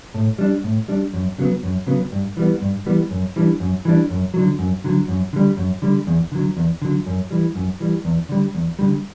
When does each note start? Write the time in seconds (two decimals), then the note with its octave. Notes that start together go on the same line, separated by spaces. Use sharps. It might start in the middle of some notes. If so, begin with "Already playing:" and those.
0.14 A2
0.39 G3 D4
0.64 A2
0.88 G3 D4
1.13 F#2
1.38 C#3 F#3 B3
1.63 F#2
1.87 C#3 F#3 B3
2.12 G2
2.37 E3 G3 B3
2.61 G2
2.86 E3 G3 B3
3.11 F#2
3.36 E3 G3 D4
3.60 F#2
3.85 E3 G3 D4
4.10 F#2
4.34 D3 F#3
4.59 F#2
4.84 D3 F#3
5.08 F#2
5.33 D3 G3
5.57 F#2
5.82 D3 G3
6.07 E2
6.32 D3 F#3
6.57 E2
6.82 D3 F#3
7.06 F#2
7.31 E3 G3
7.55 F#2
7.80 E3 G3
8.05 E2
8.29 D3 G3
8.55 E2
8.79 D3 G3